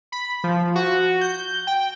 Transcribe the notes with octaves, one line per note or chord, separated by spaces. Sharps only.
B5
F3
F#4
G6
G5